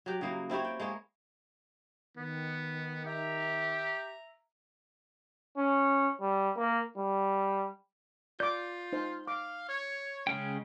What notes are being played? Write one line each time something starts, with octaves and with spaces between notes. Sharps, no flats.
F#3 G4
C#3 F#3 A#3 E4
C4 E4 G4 C#5
G5
G#3 A#3 C#5
D#3 B3
G4 E5 A#5
C#4
G3
A#3
G3
F4 D5 D6 G6
D#4 C5
F5 D6
C#5
C#3 G#3 C#4 G5